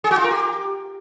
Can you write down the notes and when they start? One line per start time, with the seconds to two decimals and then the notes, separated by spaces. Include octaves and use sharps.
0.04 G#4
0.11 F#4
0.18 F4
0.24 A#4
0.31 G4